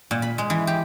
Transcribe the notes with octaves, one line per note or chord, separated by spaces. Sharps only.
A#2
B5
G#3
E3
G4